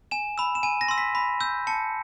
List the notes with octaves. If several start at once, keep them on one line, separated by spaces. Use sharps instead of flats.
G#5 E7
B5 E6
E7
G#5 D#7
A#6
C6 E6
B6
B5
E6 G6
A5 C#7